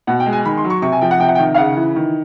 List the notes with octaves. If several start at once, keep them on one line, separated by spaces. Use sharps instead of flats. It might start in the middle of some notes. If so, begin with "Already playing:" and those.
B2 F#5
G5
G#3
G#5
D#3 B5
C6
F#3
C#6
C3 C#6
G#5
F3 G5
F#5
C3 G5
F#5
G5
D#3
F5
C#3 F#5
E3
D#3